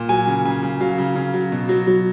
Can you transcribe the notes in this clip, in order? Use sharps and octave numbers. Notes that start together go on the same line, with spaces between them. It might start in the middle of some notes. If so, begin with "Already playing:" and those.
Already playing: A#2
F#3 G#5
C#3
C#3 G#5
C#3
F#3 F5
C#3
C#3
F#3
B2
F#3
F#3